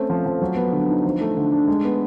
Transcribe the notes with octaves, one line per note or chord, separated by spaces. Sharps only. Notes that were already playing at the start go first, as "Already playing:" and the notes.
Already playing: A3 C4 C#4
F3
F3
F#3
B3
D3
D#4
F3
A3
D3
D4
G#3
B3